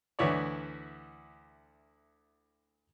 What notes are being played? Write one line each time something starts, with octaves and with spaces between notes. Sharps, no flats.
D2 E3 E4 C#5 D5